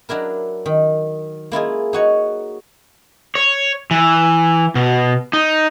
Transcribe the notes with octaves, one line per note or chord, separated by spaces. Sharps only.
F#3 D4 E4 A#4
D#3
A#3 E4 F4 G#4
D#4 F#4 C#5
C#5
E3
B2
D#4